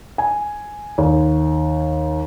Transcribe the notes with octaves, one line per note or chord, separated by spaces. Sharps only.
G#5
D#2